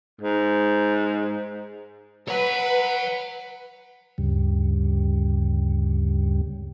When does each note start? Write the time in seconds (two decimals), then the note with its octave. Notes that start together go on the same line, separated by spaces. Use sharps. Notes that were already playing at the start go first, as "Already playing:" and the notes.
0.21 G#2
2.28 B4 C#5 F#5
4.18 D2 G2 C#3 G3